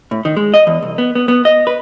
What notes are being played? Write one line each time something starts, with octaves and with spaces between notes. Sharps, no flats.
A2
D#3
G#3
D#5
E2
C2
B3
B3
B3
D#5
B4